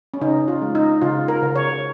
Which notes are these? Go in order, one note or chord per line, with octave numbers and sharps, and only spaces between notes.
C#4
C#3 D#4
F4
G#3
D#4
C#3 F4
A#4
C#3
C#5